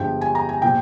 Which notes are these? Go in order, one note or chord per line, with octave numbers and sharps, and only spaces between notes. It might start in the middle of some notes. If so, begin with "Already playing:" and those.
Already playing: G1 G2 F3 G#3 G5
G#5
A#5
G#5
A#2 F3 G5